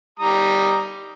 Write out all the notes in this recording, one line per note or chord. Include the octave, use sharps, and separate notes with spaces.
G3 A#5 D#6